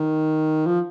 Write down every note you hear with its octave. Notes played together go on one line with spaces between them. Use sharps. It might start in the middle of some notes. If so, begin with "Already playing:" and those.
Already playing: D#3
F3